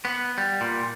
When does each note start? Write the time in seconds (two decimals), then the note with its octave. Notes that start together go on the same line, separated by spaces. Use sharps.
0.05 B3
0.38 G3
0.61 A#2